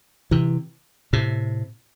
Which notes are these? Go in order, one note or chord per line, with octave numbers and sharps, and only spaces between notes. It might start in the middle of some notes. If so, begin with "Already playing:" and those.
C3 E3
A2 C3